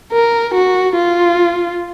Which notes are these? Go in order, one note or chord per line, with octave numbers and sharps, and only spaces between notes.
A#4
F#4
F4